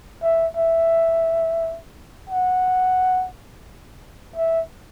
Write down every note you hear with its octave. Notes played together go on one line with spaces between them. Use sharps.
E5
E5
F#5
E5